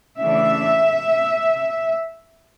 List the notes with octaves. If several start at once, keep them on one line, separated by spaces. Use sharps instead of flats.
C#3 E3 A3 D4 E5